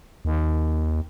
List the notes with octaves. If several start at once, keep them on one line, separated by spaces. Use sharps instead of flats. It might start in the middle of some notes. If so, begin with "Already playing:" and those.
D#2